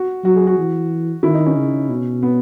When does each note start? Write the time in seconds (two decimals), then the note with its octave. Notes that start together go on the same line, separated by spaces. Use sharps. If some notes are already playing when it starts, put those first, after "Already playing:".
Already playing: F#4
0.24 F#3 F#4
0.36 G#4
0.47 F#4
0.58 E3
1.23 D#3 E4
1.34 D#4
1.46 C#4
1.57 C#3
1.89 B2
2.23 B3